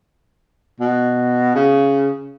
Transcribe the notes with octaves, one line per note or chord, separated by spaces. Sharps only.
B2
C#3